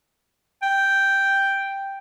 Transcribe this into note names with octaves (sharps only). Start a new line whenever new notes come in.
G5